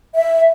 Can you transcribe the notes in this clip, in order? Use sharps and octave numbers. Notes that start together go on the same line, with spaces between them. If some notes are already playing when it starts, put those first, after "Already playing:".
E5